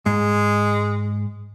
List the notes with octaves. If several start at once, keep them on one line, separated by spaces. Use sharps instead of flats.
G#2 G#3